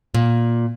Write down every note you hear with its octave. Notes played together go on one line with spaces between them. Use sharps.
A#2